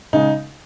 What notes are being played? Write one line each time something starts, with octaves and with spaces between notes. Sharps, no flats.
C#3 G#3 D#4